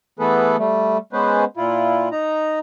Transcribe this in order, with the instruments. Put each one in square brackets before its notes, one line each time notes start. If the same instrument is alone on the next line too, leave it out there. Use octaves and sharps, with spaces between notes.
[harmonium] E3 A3 B3 G#4 A4 B4
G3 A3
G#3 B3 C#4 B4 C5
A#2 E4 F4
D#4 A#5